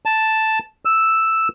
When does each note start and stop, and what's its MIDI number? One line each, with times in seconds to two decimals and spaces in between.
0.05 0.59 81
0.85 1.48 88